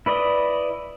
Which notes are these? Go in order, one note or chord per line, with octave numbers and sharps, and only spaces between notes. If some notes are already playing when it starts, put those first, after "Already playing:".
E4 B4 D5 D#5